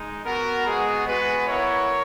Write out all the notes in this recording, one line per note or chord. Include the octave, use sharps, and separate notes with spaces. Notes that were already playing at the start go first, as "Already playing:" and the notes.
Already playing: G#3 D#4
B3 F#4 A#4
G#3 B3 F#4 G#4
G#3 B3 F#4 G#4 B4
B3 E4 A#4 C#5